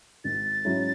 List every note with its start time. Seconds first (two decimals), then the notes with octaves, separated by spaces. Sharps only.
0.24 G#1 A6
0.64 G#2 F#3 C#4 E4